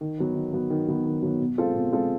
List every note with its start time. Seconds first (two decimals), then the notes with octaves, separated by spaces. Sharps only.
0.01 D#3
0.18 F#3 B3
0.35 D#3
0.53 F#3 B3
0.70 D#3
0.88 F#3 B3
1.06 D#3
1.23 F#3 B3
1.40 B2
1.58 G#3 C4 F4 A4
1.74 B2
1.92 G#3 C4 F4 A4